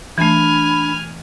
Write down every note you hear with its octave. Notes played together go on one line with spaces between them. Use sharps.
E3 A3 D4 G#5 B5 F6